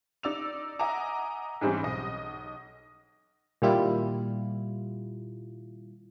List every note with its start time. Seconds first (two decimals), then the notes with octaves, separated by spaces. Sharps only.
0.23 D#4 D5 E6 F7
0.79 D#5 E5 F#5 G#5 A#5 D6
1.61 G#2 E3 G3 C4 C#4 D#4
1.83 B1 D#5
3.62 A#2 D#3 G3 E4 F4